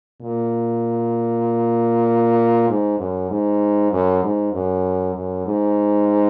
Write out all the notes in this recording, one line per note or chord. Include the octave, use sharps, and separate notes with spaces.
A#2
G#2
F#2
G#2
F#2
G#2
F#2
F#2
G#2